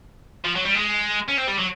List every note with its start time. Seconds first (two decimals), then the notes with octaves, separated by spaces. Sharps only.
0.45 F3
0.55 F#3
0.65 G3
0.75 G#3
1.28 C#4
1.37 C4
1.47 G3
1.58 F#3